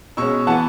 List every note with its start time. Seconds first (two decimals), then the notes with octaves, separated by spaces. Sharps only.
0.17 B2 G#3 C#4 C#6 E6
0.47 E3 B3 F#5 A5